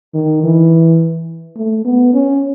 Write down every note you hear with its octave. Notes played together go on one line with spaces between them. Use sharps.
D#3
E3
A3
B3
C#4